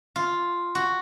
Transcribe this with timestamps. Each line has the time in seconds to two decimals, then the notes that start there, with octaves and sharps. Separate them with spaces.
0.16 F4
0.75 F#4